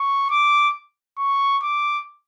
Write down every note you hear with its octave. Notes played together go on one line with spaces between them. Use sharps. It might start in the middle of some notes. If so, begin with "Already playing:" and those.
Already playing: C#6
D6
C#6
D6